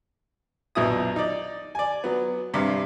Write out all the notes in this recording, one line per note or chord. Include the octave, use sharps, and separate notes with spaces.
A#1 F#2 B2 E4 D#6
D#4 D5
D5 G#5
F#3 B3
G2 C3